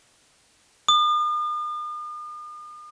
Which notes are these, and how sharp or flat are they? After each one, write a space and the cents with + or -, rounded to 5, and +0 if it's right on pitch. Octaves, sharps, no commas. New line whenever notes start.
D#6 -45